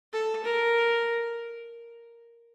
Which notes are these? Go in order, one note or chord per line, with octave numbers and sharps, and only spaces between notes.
A4
A#4